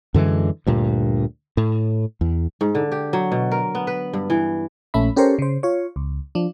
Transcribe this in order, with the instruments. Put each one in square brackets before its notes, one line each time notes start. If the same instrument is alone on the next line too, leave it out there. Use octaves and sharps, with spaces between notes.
[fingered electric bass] F#2 D3 E3 G#3
D2 G2 A#2
A2
E2
[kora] G#2
D3
G4
F#3
B2
A#4
B3
B4
G2
E3
[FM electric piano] A#1 A3 C#4 E5 B5
C#4 G4 A4 A#4 C5 C#5
C#3 C5
F4 C#5
C#2
F3 D4